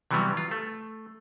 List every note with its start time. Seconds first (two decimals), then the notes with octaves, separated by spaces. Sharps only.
0.11 C3 E3 F#3 G3 B3
0.37 F4
0.51 A3